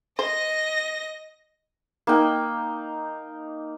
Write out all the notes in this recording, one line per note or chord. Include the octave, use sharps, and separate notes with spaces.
C5 D#5 A#6
A#3 D#4 G5